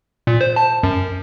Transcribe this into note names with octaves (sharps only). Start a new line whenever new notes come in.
A#2
C5
A5
F#2